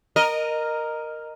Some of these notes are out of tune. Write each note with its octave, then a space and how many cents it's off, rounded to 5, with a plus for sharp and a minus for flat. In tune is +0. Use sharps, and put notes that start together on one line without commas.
A#4 +0 D#5 -15